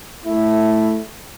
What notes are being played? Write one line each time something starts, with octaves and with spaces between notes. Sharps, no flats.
A3 E4